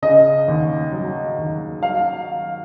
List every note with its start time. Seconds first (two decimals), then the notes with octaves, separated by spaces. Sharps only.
0.02 C#3 D#5
0.48 D#2
0.93 F#3
1.38 D#2
1.82 F#3 F5